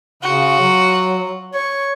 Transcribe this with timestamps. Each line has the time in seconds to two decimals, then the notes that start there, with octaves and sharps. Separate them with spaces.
0.23 C#3 F4 F#4
0.60 F#3
1.54 C#5 C#6